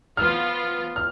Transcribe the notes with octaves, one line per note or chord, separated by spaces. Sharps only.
F3 B3 F4 F6
F6